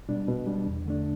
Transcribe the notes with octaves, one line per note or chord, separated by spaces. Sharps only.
B2 G3 D4
B2
G3 D4
E2
D3 A3 D4